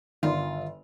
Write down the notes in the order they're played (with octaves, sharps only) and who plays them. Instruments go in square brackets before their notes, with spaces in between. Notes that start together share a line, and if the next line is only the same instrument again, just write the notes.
[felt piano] G1 D5 [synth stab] D#3 [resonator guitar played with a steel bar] F4